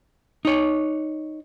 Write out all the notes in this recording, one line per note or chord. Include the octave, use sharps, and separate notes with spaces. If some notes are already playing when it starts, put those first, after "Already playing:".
D#4 C#5